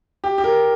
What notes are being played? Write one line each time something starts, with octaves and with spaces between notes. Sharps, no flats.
G4
G4
A#4